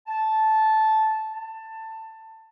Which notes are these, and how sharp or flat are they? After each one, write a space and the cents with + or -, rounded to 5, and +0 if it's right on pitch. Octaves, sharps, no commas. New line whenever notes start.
A5 -10
A5 +15